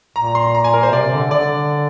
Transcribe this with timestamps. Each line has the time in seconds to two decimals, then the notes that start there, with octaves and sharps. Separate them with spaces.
0.16 A#2 A#5
0.35 C6
0.55 A#5
0.64 G#5
0.74 A#4
0.83 C5
0.92 C3 D5
1.13 D3
1.31 D3 D5